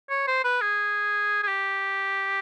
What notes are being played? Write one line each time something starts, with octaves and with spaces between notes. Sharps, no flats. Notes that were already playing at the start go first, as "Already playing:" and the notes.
C#5
C5
B4
G#4
G#4
G4